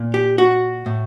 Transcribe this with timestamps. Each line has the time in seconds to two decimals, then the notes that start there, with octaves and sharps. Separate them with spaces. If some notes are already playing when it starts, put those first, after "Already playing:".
Already playing: A#2
0.14 G4
0.38 F#4
0.86 A2